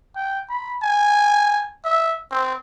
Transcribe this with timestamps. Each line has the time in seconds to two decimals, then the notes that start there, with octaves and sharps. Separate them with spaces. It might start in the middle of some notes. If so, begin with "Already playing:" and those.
0.16 G5
0.49 B5
0.82 G#5
1.85 E5
2.31 C4